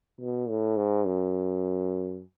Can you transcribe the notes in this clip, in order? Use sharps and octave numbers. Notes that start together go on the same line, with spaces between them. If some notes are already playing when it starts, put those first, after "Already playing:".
B2
A2
G#2
F#2